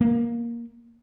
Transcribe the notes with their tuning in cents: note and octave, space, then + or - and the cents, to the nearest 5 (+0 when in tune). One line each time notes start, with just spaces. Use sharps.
A#3 +10